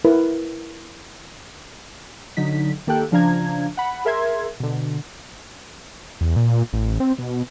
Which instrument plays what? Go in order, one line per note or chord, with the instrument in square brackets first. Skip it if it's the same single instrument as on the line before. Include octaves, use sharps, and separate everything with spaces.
[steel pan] E4 A#4 B4
[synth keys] D3 F#3 D#4 B6
D#3 A#3 G4 A4 G5 F#6
C#3 F3 D4 F5 A#5 G#6
F#5 B5
G#4 A#4 E5 C6 G#6
B2 D3
[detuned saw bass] E2
A#2
A1
C4
B2